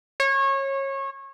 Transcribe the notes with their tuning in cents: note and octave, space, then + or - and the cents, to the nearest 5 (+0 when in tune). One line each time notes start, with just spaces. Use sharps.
C#5 -25